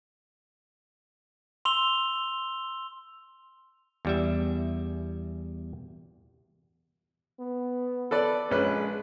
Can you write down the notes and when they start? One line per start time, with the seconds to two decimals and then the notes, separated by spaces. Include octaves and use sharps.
1.65 C6 E6 F7 G7
4.05 E2 G3 E5
7.40 B3
8.11 A4 B4 D5
8.51 A#1 G#3 C#4 B4